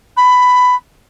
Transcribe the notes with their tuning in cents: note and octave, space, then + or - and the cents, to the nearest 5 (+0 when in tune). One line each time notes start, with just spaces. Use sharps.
B5 +10